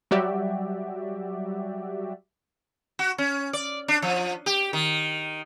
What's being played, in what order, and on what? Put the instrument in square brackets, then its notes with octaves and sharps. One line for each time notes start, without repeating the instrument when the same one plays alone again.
[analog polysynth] F#3 G3 F#4 G4 D5 E5
[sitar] F#4
C#4
D5
D4
F3
G4
D#3